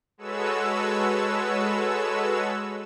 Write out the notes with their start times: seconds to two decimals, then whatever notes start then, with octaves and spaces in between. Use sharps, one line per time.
0.18 G#3 F#4 A4 B4 C#5 E6